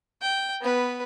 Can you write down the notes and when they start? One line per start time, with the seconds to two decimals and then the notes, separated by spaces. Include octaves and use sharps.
0.22 G5
0.61 B3 B4